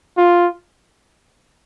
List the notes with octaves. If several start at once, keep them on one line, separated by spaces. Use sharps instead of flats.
F4